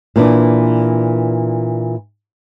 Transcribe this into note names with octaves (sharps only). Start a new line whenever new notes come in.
A#2 E3 D4